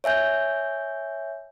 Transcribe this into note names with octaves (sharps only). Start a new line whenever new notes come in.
C#5 E5 G#5 G6